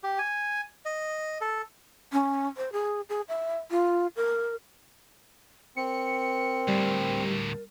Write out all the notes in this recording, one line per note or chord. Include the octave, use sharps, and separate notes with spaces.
G4
G#5
D#5
A4
C#4
C5
G#4
G#4
E5
F4
A#4
C4 A#4 C#7
D2 A2 G3